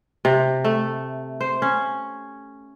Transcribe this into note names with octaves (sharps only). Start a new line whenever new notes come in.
C3
A3
C5
C#4